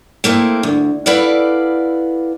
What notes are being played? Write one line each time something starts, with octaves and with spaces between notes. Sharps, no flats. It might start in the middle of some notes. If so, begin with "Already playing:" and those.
A3 A#3 C4 E4
D2
E4 A4 B4 D5 F5 F#5